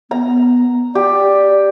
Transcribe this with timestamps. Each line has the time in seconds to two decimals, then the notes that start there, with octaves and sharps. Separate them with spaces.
0.11 B3 A#5
0.95 G4 D5